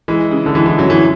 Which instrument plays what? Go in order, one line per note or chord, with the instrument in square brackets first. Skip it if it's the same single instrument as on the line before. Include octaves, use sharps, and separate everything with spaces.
[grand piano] E3 [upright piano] G#3
[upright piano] C#3
[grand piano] D3
[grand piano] E3 [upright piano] G#3
[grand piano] E3
[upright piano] F#2 [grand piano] F#3
[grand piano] E3